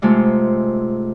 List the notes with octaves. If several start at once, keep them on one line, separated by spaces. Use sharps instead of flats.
G#2 C3 G#3 A3 F4